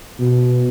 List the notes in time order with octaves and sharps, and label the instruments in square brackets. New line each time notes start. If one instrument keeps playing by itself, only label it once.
[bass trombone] B2